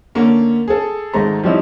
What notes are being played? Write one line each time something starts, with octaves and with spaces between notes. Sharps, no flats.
D3 A3 A#3 C#4
G#4 A4
G#1 G#3 A3 A#5
F3 G3 C4 C#4 D#4 E4